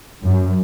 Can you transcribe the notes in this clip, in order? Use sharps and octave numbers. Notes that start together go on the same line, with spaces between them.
F#2